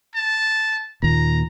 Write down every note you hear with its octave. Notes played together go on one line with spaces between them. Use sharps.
A5
D#2 A#2 A#5